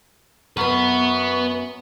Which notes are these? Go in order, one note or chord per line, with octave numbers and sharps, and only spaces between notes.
F#2 B3 B4 F#5 C#6